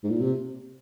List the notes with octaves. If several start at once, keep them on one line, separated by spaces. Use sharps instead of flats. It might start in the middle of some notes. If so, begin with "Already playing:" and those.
G#2
A#2
C3